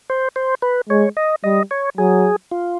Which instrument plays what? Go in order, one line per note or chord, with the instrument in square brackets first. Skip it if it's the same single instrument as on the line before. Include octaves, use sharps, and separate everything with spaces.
[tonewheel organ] C5
C5
B4
[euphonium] G#3 [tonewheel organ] C#5
[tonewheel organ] D#5
[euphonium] G3 [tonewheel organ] D#5
[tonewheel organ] C#5
[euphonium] F#3 [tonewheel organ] G#4
[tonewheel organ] F4